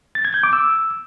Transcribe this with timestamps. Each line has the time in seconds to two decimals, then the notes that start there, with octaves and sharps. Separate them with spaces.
0.15 A6
0.25 G#6
0.34 G6
0.43 D6
0.53 E6